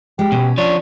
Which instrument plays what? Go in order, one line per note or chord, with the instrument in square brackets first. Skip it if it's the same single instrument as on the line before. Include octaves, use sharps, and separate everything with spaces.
[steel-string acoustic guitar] G#3 [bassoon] G4
[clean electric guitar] B2 [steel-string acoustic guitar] C#4
[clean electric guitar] F3 C#5 [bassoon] D4